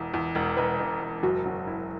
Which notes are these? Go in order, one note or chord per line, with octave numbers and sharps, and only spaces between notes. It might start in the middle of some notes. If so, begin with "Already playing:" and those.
Already playing: E1 E2
E2
E1
E1 B4
E1
E1
F#1 F#4
F#3
E4